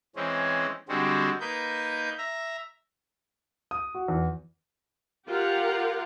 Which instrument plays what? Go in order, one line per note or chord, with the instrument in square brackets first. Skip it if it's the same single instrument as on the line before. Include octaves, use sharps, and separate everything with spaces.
[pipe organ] E3 G#3 C4 C#4
D3 G3 G#3 C4 F#4
A#3 D#4 B4 G6
E5 A#5
[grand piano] D#6
F#4
E2
[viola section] F4 G4 A#4 F5 F#5